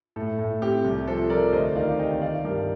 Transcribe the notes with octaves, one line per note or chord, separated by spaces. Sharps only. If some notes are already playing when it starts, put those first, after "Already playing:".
A2 A4
A2
C4 G4
C2
F3 A4 C5
F3 A#4 D5
D2 C5 D#5
D#3 D5 F5
C3 D#5 G5
D#3 D5 F5
G2 G4 A#4